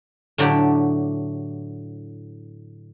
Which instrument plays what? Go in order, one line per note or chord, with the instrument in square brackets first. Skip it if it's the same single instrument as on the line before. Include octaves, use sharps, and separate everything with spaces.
[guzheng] A2 D3 F#3 G4